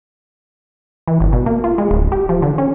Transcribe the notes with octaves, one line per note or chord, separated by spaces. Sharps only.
E3
G1
B2
A#3
F4
G#3
D1
G4
F3
D3
C#4